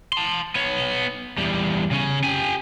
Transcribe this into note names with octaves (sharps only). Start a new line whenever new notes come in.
A5 C6
B3 C#5
E2 G3
C#3 C#4
G4 G#5